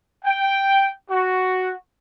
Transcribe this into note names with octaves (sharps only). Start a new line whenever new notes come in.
G5
F#4